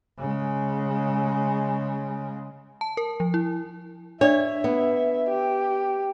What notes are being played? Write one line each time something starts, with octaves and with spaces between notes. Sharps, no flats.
C#3 G#3
A5
A#4
F3
E4
D4 C#5 D5 E5
B3
G4